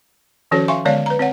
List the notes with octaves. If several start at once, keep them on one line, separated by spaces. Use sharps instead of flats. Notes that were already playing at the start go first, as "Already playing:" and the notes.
D#3 F3 C#4 F#4 A4 C#5
E5 F5 G#5 C6 C#6
D3 G#3 B3 C#5 D5 F5
B4 A#5
C4 C#5 F#5